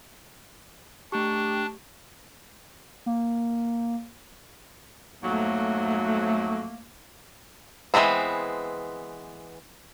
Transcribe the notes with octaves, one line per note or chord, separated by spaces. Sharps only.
A3 D4 G4 C#6
A#3
F2 G#2 F#3 A3 A#3
E3 G3 G#3 B3 C4